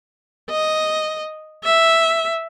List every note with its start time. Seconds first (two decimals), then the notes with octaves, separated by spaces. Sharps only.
0.50 D#5
1.64 E5